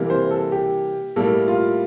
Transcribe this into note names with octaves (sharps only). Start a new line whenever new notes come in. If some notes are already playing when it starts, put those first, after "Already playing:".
Already playing: C3 E3 G3 A#3
C5
A4
G4
A2 G3 A#3 A4
F4